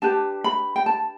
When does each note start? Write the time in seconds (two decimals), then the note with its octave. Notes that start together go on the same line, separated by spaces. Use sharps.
0.02 D4 G4 B4 A5
0.44 B5
0.76 G5
0.86 A5